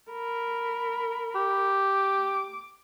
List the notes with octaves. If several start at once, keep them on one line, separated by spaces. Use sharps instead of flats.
A#4 B5
G4
D6